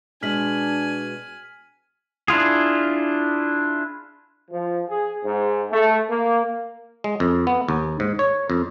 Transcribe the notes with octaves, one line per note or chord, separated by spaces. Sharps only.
B2 G#3 D4 G#5 F6 B6 F#7
D4 E4 F4 G#4
F3
G#4
G#2
A3
A#3
G#3
F2
B3
D#2
G#2
C#5
F2